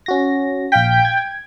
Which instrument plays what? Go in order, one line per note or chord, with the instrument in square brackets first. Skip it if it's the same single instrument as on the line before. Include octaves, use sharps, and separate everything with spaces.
[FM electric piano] C#4 F#4 A#6
[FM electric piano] A#1 F5 B6 [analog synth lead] G5
[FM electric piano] G#6